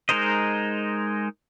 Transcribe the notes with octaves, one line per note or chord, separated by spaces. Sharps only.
G#3 D#4 A#4 C5 D#5